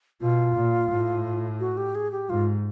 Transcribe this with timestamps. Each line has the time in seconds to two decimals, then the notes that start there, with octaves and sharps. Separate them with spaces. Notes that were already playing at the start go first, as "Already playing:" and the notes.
0.21 B2 F4
0.55 A#2
0.90 A2
1.60 F#4
1.77 G4
1.95 G#4
2.12 G4
2.29 G#2 F4